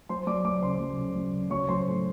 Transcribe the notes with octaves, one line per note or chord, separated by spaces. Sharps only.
F#3 C5 C6
F#3 D5 D6
F#3 D5 D6
C#3 C5 C6
F#3
C#3
F#3
C#3
F#3 C#5 C#6
F#3 C5 C6
A2